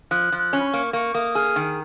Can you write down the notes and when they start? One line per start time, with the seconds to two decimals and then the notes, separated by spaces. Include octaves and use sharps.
0.11 F3 F#6
0.32 F3
0.39 F#6
0.53 C#4
0.60 B5
0.67 C#6
0.74 A#3
0.93 A#3 C#6
1.14 A#3 D#6
1.35 G#4 F6
1.56 D#3